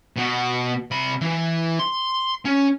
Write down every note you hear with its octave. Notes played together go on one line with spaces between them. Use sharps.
B2 F#4
C3 B5
E3
C6
C#4